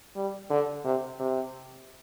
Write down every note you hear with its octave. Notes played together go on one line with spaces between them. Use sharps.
G3
D3
C3
C3